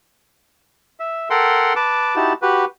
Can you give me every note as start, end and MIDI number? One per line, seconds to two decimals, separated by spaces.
1.00 1.29 76
1.30 1.73 69
1.30 1.73 70
1.30 1.73 78
1.30 1.73 79
1.30 1.73 84
1.76 2.16 71
1.76 2.16 81
1.76 2.16 86
2.16 2.33 63
2.16 2.33 64
2.16 2.33 66
2.16 2.33 67
2.16 2.33 81
2.42 2.65 66
2.42 2.65 67
2.42 2.65 71